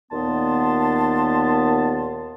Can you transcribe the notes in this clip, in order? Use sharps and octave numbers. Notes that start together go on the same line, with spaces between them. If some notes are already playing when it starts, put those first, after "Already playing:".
D#2 A#2 B3 A5 C6